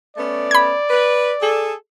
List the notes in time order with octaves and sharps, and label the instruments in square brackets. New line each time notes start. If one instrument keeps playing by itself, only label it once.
[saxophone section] A3 B3 C#4 [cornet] D5
[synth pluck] B5 G#6
[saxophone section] B4
G#4 A4